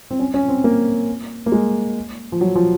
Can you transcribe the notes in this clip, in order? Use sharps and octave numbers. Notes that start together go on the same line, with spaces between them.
C4
C#4
C#4
C4
A#3
A#3
G#3
F3
F#3
F3